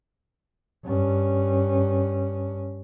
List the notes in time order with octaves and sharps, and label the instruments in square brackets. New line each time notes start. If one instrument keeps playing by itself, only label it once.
[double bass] G2 C#4